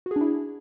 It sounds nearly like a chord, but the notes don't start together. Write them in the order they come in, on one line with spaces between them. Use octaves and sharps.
F#4 G#4 D4 E4